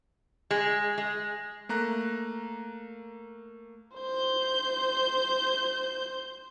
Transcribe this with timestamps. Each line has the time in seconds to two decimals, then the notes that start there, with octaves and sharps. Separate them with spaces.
0.51 G#3
0.98 G#3
1.69 A3 A#3 A#5 F#6 A#6
3.97 C5 G6